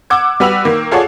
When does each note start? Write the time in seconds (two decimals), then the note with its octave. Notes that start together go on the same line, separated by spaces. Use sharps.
0.10 F#5 D6 E6 G#6
0.40 G3 F#4 B4 E6 F7 F#7
0.65 D#3 A#3
0.91 F4 G#4 A4 C#5 D5 F#5